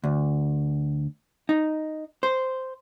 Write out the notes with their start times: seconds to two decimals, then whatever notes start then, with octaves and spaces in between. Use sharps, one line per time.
0.04 D2
1.49 D#4
2.23 C5